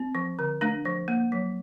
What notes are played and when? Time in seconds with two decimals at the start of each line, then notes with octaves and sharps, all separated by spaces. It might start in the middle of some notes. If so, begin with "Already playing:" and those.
Already playing: C4
0.15 F3
0.39 D3
0.61 A3 D4
0.85 F3
1.08 A#3
1.32 F#3